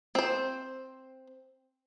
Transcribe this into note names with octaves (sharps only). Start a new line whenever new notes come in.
C4 C5